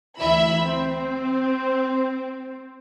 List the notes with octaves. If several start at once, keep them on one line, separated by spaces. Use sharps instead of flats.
D2 E3 E4 E5 B5 E6
C4